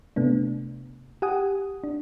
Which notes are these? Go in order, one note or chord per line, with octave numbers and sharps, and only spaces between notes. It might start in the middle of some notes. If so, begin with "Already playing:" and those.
C3 A3 B3 D4
G4 F#5 G#5 D#6
D4